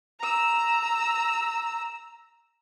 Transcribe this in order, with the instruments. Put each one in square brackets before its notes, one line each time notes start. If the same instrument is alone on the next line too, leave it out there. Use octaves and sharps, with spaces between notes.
[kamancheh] A#5 E6